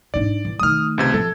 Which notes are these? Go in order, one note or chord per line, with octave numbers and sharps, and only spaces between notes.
G#2 D4 D5
E3
D#3 A3 D#6 F6
C#2 C3 G#6
F3 A4